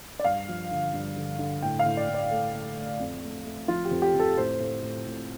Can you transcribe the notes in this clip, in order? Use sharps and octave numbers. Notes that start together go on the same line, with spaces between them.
D5
G2 F5
F3
D3
G2
D3
D3
A2 G5
F5
A2
D5
A2
D5
A3 A4
A3
A3
F2
A3
A3
F3 F4
G4
F2
G4
F2
A4
A2 C5
A2
A2
A2